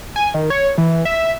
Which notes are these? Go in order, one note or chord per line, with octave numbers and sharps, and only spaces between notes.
G#5
D#3
C#5
E3
E5